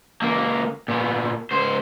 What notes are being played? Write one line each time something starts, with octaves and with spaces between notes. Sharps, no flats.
C#2 A#3
A#2 B3
C#2 C5